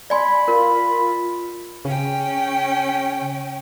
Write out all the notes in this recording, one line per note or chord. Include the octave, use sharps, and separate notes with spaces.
D5 G#5 B5 C6
F4 A#4
C#3 C#4 G5